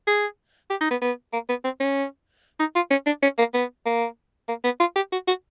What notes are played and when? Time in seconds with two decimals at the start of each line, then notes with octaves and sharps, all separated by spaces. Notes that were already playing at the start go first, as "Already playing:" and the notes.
0.07 G#4
0.70 G4
0.81 D#4
0.91 B3
1.02 B3
1.33 A#3
1.49 B3
1.65 C4
1.80 C#4
2.60 D#4
2.76 F4
2.91 C#4
3.06 D4
3.23 C#4
3.39 A#3
3.54 B3
3.86 A#3
4.49 A#3
4.64 B3
4.80 F4
4.96 G4
5.12 F#4
5.28 F#4